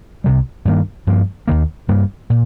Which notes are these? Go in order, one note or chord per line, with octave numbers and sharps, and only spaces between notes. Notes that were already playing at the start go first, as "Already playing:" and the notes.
C2 C3 G3
G2 D#3 A#3
G2 F3 A#3
D#2 D#3 A#3
G2 G3 A#3
A#2